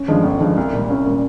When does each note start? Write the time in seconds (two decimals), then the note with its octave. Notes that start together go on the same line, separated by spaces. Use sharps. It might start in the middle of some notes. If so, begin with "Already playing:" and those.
Already playing: C#4
0.08 G2 D3 F3 G#3
0.24 G1
0.40 G2 D3 F3 G#3
0.57 C2
0.73 A#2 G3
0.90 C2 C#4
1.06 A#2 G3